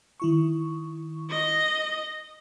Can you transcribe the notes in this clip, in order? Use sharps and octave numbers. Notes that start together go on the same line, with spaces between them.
D#3 E4 C#6
D#5